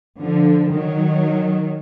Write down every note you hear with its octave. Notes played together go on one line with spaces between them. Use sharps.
D3 F3
D#3 F#3